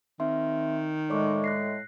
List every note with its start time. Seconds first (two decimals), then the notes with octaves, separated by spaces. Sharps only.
0.20 D#3 C4 E5 C6
1.10 A2 G#3 D5 C#6 D6
1.44 F#6 A#6 C7